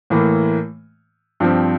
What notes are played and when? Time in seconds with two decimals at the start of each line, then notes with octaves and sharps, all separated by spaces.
0.10 A2 E3 A#3
1.40 G2 F3 C4